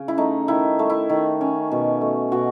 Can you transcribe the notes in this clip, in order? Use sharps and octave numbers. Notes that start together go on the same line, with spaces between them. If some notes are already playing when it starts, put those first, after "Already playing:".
Already playing: C#3
E4
A3 D#4
D#3 E4
A3
E4
D#3
C#4
B2
A3
B2 F#4